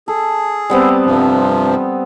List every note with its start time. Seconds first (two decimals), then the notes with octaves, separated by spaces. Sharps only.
0.08 G#4 A4
0.70 G3 B3 C4
1.06 G2 C3 F3